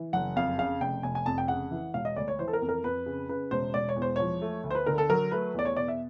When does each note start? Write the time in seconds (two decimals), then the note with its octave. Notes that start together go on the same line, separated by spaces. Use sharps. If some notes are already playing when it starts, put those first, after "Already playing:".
Already playing: E3
0.13 F#1 F#5
0.36 F2 F5
0.58 C#3 F5
0.81 F1 G5
1.03 F1 G#5
1.15 G#5
1.26 F2 A5
1.38 G5
1.48 C#3 F#5
1.71 E3
1.94 E1 F5
2.05 D#5
2.16 D2 D5
2.28 C#5
2.39 E3 C5
2.48 A4
2.53 A#4
2.62 F2
2.69 A#4
2.84 F2 B4
3.06 C#3
3.29 C#3 B4
3.51 E1 C5
3.74 E1 D5
3.89 C#5
3.96 E2
4.02 C5
4.16 F3 C#5
4.42 A3
4.64 D2
4.71 C5
4.75 B4
4.86 D3 A#4
4.98 A4
5.09 F#3 A#4
5.31 A3 B4
5.54 E2 D5
5.65 C#5
5.77 B2 D5
5.88 E5